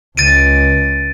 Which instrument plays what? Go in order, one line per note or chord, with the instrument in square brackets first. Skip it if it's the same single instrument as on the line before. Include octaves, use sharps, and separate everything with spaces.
[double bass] C#2 [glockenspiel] A6 D7 D#7